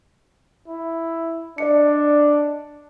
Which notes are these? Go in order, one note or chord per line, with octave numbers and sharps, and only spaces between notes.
E4
D4 D5 D#5 C#7